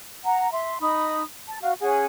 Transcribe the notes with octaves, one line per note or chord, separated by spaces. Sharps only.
F#5 A#5
E5 C6
D#4 B5 D#6
A5
F#4 F5
C#4 G#4 F#5 G#5